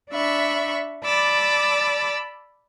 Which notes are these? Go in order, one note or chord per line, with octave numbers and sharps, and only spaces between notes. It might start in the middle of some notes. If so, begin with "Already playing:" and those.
D4 E5 B5 C#6
D5 A5 B5 D6 E6